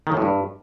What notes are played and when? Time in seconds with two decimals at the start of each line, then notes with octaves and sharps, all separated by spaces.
0.07 D#3
0.12 F#2
0.17 A2
0.22 G2